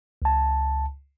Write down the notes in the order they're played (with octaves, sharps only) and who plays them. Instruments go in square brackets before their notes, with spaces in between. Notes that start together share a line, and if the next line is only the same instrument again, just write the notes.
[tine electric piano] C#2 A5